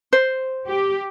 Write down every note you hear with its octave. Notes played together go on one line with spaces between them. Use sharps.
C5
G4